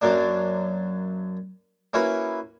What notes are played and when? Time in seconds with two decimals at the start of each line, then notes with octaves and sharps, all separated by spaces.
0.01 F#2 F#3 A#3 D4
1.93 A#3 C#4 E4 F#4 B4